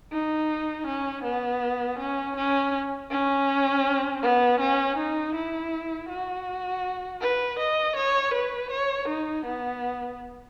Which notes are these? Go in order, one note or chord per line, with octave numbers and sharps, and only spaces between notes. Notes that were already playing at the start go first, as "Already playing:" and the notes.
D#4
C#4
B3
C#4
C#4
C#4
B3
C#4
D#4
E4
F#4
B4
D#5
C#5
B4
C#5
D#4
B3